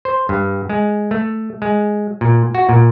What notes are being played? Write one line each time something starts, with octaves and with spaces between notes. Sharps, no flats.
C5
G2
G#3
A3
G#3
A#2
F#4
A#2